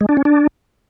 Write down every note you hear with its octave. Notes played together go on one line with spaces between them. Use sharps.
G#3
D4
C#4
D4